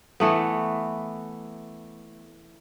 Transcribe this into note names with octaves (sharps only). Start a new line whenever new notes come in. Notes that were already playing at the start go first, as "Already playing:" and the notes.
E3 A3 B3